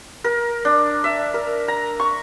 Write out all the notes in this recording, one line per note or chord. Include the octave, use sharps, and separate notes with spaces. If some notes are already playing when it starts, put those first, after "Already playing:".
A#4
D4
E5
A#4
A#5
C#6